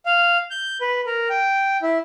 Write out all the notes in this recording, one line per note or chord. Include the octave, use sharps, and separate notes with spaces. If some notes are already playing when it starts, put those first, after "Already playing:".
F5
G6
B4
A#4
G5
E4